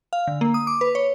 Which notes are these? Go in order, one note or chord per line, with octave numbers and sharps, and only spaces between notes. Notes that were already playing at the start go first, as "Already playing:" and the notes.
F5
D3
A#3
D#6
D6
B4
C#5